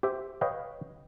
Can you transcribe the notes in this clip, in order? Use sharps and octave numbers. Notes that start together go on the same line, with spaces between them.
G4 C5 E5 G5
B4 C#5 D#5 F5 G5